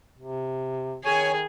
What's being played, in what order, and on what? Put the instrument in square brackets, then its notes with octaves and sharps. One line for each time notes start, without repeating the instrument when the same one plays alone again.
[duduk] C3
[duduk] D#3 [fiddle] G#4 [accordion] C#5 G#5